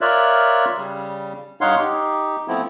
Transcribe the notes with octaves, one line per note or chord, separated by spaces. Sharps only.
F4 A#4 C#5 D5 E5 F#6
C#3 G3
G2 D#4 C#5 F5 F#5 C6
D#4 G4
F3 A3 B3 C4 E4